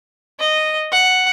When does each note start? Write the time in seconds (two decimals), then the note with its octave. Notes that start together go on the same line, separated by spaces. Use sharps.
0.40 D#5
0.92 F#5